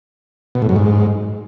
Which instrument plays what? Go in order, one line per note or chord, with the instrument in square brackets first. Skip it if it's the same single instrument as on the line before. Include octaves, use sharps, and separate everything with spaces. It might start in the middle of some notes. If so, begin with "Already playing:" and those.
[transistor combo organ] B2
A2
F#2
G#2